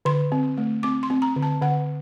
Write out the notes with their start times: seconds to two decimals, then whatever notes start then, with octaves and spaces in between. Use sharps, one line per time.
0.05 D3 C6
0.32 C4
0.58 A3
0.83 C4 D6
1.03 C6
1.10 C4
1.22 A#5
1.36 D3
1.42 A5
1.62 D3 F#5